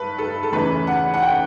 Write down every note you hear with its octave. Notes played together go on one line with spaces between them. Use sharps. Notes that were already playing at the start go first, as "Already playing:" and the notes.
Already playing: G2 B4
A4
A4
E2 C#3 E3 A3 B4
F#5
F#5
G5